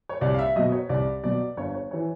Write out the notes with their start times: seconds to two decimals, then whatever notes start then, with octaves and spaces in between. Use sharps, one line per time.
0.09 C#5
0.21 C2 D5
0.34 F5
0.39 E5
0.56 B2 F#3 D#5
0.72 C#5
0.89 C2 D5
1.23 B2 F#3 D5
1.57 G1 C#5
1.74 C#5
1.91 E3 C#5